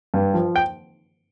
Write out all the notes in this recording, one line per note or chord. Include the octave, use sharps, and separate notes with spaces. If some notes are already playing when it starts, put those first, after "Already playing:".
G2
F3
G5